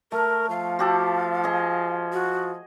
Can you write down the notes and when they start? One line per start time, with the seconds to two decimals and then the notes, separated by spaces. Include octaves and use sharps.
0.12 A3 A#4
0.50 F3 F5
0.79 F#4 G4 A4
1.44 G#4 D#5
2.13 F#4